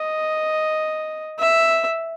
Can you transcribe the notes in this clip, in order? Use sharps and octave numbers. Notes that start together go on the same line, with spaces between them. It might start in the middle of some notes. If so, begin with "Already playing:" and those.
Already playing: D#5
E5